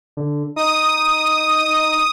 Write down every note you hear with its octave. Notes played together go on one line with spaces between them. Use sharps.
D3
D#4 D#6